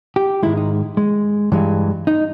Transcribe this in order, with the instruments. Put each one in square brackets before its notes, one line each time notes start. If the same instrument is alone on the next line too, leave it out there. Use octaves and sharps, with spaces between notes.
[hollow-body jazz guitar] G4
G#2 D#3 G#3 E4
D#4
G#3
G2 E3 G#3
D#4